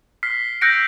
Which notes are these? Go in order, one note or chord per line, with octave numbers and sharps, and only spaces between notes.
F6 B6 C7
E6 F#6 G6 A#6 C#7 D7